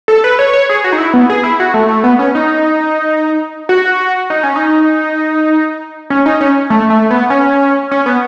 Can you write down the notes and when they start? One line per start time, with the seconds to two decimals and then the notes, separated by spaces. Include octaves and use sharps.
0.08 A4
0.24 B4
0.39 C#5
0.53 C#5
0.69 G#4
0.84 F#4
0.93 D#4
0.98 E4
1.14 B3
1.30 G#4
1.43 E4
1.60 F#4
1.74 A3
1.89 A3
2.04 B3
2.19 C#4
2.35 D#4
3.69 F#4
4.30 D#4
4.43 C#4
4.56 D#4
6.10 C#4
6.26 D#4
6.41 C#4
6.70 A3
6.90 A3
7.10 B3
7.30 C#4
7.91 C#4
8.06 B3